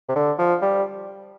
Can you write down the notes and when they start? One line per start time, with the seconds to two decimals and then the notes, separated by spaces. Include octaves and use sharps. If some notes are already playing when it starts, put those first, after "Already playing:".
0.09 C3
0.16 D3
0.39 F3
0.62 G3